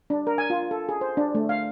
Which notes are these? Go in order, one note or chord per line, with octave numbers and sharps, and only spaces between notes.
D4
A#4
G#5
F4
A4
G#4
C5
D4
A3
F5